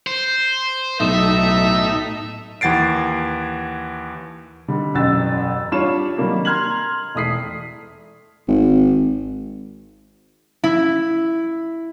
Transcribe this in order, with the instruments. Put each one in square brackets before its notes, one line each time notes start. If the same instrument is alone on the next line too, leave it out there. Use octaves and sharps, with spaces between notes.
[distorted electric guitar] C5
[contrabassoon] B1 [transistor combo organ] A2 D#4 [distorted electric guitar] E5
[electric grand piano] D#2 E3 F#5 A6 C7 D7
[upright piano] D3 D#3 G3
E1 A1 F#2 E6 A6
G3 D4 F4 C#5 E7
D#3 F#3 G3 A#3 D4 D#4
A#5 C6 F6 G#6 F#7
E1 A3 E4 D#6 B6 C7
[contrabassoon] G#1
[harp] E4